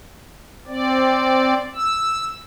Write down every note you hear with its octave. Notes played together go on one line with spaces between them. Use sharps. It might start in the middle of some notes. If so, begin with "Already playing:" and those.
C4 D5
E6